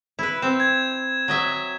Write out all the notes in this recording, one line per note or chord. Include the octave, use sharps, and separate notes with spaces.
E4 B4
C4 E7
G#6
F#3 D#5 E5